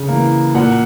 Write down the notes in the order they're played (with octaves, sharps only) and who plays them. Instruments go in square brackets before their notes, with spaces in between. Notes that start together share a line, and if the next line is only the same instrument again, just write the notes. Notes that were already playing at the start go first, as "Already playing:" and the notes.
Already playing: [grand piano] C#3
E3 A#3
A#2 F#5